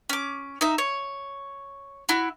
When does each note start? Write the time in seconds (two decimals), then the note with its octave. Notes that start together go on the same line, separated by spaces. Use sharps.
0.09 C#4 D6
0.61 D#4 E5
0.78 C#5
2.09 E4 F#4